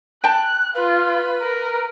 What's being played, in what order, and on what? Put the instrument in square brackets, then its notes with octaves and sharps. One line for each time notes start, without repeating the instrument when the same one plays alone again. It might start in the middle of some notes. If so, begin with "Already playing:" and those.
[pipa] G5 A5 [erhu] F#6
[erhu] F4 [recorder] B4
[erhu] A#4